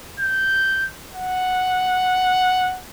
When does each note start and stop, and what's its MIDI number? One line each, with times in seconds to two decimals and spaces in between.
0.20 0.90 91
1.13 2.78 78